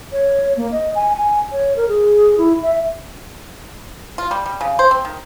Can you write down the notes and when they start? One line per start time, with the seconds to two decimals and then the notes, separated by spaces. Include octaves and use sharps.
0.12 C#5
0.57 A#3
0.72 D#5
0.95 G#5
1.17 G#5
1.52 C#5
1.76 A#4
1.88 G#4
2.38 E4
2.63 E5
4.18 F4
4.31 G3
4.46 G3
4.61 C#3
4.79 C5
4.91 C4
5.05 D#3